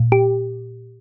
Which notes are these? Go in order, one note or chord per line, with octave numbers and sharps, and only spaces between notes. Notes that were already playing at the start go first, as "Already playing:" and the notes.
Already playing: A#2
G4